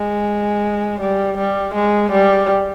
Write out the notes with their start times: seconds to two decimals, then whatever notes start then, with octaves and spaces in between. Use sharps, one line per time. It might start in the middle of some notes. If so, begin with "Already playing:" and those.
Already playing: G#3
1.01 G3
1.38 G3
1.74 G#3
2.12 G3